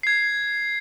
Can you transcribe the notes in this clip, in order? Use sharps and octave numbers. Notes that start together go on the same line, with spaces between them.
G#6 C7